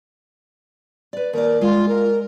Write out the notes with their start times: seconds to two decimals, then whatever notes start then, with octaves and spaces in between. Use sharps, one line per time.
1.13 B4 D5
1.33 D#2 A#4 D5
1.61 G#3 F4
1.88 A#4